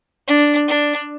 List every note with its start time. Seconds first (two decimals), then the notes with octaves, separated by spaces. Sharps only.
0.27 D4
0.68 D4